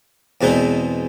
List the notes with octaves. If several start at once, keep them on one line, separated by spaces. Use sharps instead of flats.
E2 B2 G#3 C4 D#4